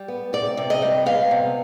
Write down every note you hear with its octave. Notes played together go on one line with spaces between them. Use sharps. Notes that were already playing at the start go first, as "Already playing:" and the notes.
Already playing: G3
B3
C3 D5
C3
D#5
G3
B3 F5
C3